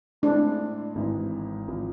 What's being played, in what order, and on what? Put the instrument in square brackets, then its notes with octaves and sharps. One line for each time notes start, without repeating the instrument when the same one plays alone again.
[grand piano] A2 G#3 C4 E4 [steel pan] D4
[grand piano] G#1 G#2 E3
G#1 F3